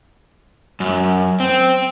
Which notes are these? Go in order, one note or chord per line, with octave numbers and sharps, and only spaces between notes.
F#2
C4